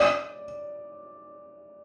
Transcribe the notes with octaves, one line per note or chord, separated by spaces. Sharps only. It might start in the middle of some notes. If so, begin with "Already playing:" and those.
Already playing: D5